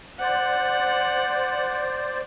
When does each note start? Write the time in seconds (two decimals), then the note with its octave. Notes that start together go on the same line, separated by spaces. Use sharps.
0.20 C5 D5 F#5